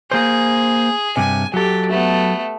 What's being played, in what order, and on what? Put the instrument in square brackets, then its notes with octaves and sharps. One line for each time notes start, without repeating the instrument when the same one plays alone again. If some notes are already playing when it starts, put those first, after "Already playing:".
[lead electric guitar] A#3 C5 [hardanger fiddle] G#4
[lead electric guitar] G2 C3 [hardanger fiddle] G#5
[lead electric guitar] F#3 A4 [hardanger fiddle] G4
[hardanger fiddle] A3 B3